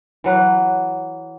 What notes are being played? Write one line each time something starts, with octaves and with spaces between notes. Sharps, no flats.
E3 F#3 B4